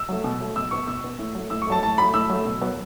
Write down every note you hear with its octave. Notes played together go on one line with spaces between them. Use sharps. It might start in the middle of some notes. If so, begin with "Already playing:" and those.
Already playing: E6
F#3 A3
B2
F#3 A3
B2 E6
B3 C#6
B2 E6
B3
A2
F#3 A3
A2 E6
C#6
F#3 A3 A5
A2 A5
F#3 A3 B5
A2 E6
F#3 A3
B2
F#3 B3